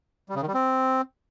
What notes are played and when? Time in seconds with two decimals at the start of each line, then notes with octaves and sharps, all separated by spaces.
0.29 G3
0.35 C#3
0.42 D#3
0.48 G3
0.54 C4